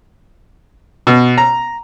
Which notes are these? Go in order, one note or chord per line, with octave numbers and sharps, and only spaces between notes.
B2
A#5